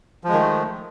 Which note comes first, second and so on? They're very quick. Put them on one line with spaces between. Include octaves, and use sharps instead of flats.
F3 G#3 D#3 A3